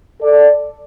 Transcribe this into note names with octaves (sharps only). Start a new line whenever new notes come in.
A4 D5